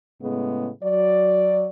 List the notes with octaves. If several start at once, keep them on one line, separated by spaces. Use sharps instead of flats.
A2 C#3 G#3 B3
F#3 D5